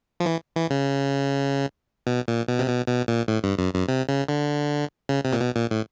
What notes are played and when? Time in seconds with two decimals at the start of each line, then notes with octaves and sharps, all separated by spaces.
0.20 F3
0.26 E3
0.56 E3
0.70 C#3
2.07 B2
2.28 A#2
2.48 B2
2.59 C3
2.68 B2
2.88 B2
3.08 A#2
3.28 A2
3.44 G2
3.59 F#2
3.74 F#2
3.88 C3
4.09 C#3
4.28 D3
5.09 C#3
5.25 C3
5.33 A#2
5.40 B2
5.56 A#2
5.71 A2